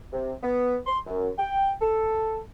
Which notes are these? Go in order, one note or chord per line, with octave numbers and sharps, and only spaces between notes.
C3
B3
C6
F#2
G5
A4